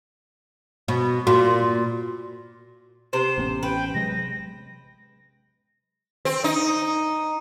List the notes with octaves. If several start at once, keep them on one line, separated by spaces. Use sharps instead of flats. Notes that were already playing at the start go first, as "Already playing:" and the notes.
B2
A#2 F#4
C3 C5 E7
A1 B3 C#4
B4 G5
C3 F#3 G#3 A#6
C4
D#4